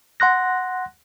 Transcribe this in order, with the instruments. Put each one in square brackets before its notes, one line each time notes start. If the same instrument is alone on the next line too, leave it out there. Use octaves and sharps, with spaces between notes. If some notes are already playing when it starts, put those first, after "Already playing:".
[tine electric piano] F#5 C6 F#6 A#6